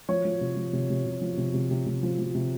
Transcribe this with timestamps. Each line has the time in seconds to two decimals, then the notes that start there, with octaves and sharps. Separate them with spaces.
0.09 F3 C#5
0.25 F3
0.41 C3
0.57 F3
0.73 C3
0.90 C3
1.06 C3
1.21 F3
1.38 C3
1.54 C3
1.71 C3
1.86 C3
2.03 F3
2.19 F3
2.35 C3